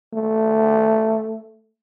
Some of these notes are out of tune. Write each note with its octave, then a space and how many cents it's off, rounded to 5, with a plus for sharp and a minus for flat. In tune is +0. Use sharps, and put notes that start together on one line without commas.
A3 +5